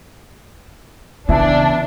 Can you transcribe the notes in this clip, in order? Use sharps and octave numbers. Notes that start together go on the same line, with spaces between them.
C#3 E3 B3 D4 E4